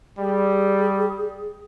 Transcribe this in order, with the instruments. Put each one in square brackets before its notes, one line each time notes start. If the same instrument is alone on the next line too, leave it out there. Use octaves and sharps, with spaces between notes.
[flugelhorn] G3 [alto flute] G#4